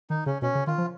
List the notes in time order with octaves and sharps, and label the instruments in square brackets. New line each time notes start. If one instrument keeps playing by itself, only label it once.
[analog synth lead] D#3 [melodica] D#4
[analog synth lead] C#3 [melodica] C#4
[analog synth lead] B2 [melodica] C#4
[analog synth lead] C#3
[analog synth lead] D#3 [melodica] F4
[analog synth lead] F3